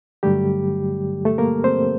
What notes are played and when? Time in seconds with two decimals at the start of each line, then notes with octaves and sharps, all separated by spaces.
0.23 G2 D3 F#3 G3 A3 G4
1.25 A3 A4
1.38 A#3 A#4
1.64 C4 C5